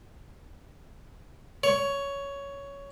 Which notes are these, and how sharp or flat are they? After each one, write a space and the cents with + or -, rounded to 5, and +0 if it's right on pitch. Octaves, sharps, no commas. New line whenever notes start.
C#5 +10